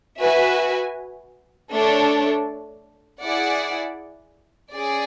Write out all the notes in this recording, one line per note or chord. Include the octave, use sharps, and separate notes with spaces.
F#4 B4 E5 G#5
A3 D4 A4 C#5
E4 G#4 D5 F#5
C#4 G#4 D5